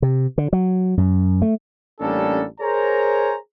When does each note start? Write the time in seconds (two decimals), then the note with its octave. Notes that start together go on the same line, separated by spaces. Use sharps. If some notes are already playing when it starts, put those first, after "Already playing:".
0.02 C3
0.38 D3
0.53 F#3
0.97 F#2
1.42 A3
2.00 A1 G3 A#3 C#4 D4 A4
2.60 G#4 A#4 C5 C#5 G#5 A#5